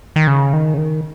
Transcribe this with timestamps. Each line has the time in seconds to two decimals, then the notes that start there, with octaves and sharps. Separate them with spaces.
0.16 D#3
0.27 C#3
0.53 D#3
0.74 C#3
0.78 D#3